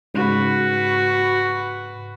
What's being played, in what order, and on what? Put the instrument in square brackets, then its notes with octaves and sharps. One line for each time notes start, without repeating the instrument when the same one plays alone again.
[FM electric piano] G#2 C#3 [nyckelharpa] F#4 B4